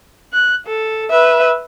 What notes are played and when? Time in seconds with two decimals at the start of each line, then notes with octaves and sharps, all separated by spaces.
0.33 F#6
0.67 A4
1.10 B4 E5